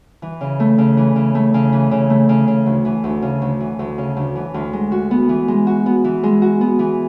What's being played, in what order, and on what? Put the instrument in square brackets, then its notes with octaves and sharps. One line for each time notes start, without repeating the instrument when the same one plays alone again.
[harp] E3
C#3
A3
C#3
E3
C#3
A3
C#3
E3
C#3
A3
C#3
C#3
D2
E3
D2
C#3
D2
E3
D2
C#3
D2
E3
D2
G#3
F#4
B3
E3
G#3
F#4
B3
E3
G#3
F#4
B3
E3